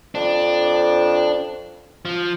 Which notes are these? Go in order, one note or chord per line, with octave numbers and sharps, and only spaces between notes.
F2 D4
F3